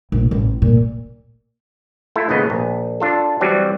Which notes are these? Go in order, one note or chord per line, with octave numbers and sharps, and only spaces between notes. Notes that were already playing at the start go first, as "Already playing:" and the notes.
A#1
A1
A#2
A3 E4 F4 A4
G#1 D#2 A2 C#3 B3 D#5
A#1
D4 F4 A4
E3 F#3 G3 C4